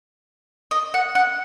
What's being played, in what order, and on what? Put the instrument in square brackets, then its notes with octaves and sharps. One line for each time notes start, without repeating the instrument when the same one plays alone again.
[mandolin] D#5
F#5
F#5